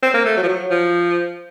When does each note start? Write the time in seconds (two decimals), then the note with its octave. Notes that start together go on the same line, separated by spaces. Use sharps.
0.02 C4
0.14 A#3
0.25 A3
0.37 F#3
0.43 F3
0.48 F#3
0.70 F3